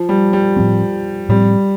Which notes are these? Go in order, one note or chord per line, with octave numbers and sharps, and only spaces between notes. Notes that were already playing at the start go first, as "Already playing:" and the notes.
Already playing: F3
G3
G3
A2 F3 C4
A2 F3 G3 C4